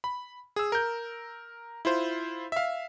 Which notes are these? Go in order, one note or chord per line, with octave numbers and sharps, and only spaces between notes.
B5
G#4 E6
A#4 G6
E4 F4 C5
E5 F5